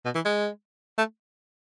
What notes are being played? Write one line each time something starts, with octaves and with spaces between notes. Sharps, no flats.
B2
E3
G#3
A3